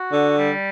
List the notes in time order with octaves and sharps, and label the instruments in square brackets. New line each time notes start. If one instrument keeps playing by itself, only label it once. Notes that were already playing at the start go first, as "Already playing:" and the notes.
Already playing: [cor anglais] F#4
[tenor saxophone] D3
[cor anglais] G3